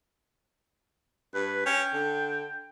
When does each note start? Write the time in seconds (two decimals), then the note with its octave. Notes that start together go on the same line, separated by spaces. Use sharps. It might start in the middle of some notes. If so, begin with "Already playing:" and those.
1.34 G2 B4
1.66 C#4 G5
1.93 D3